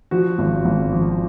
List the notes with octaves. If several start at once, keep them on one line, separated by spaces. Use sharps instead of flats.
F3 F#4
G#1
G#1
F3